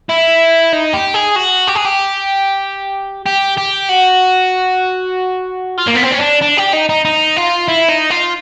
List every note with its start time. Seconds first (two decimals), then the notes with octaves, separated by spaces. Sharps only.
0.10 E4
0.73 D#4
0.94 G4
1.15 G#4
1.36 F#4
1.68 G4
1.76 G#4
1.85 G4
3.26 G4
3.57 G4
3.89 F#4
5.78 F4
5.88 A#3
5.96 B3
6.04 C4
6.12 C#4
6.20 D4
6.42 D4
6.58 G4
6.73 D#4
6.89 D#4
7.05 D#4
7.37 F4
7.69 E4
7.89 D#4
8.10 F4